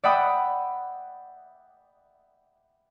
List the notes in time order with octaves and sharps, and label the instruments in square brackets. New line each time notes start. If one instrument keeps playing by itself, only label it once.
[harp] D5 E5 F#5 G5 B5 D#6